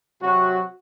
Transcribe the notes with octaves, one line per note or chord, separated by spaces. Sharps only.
C3 F#3 F#4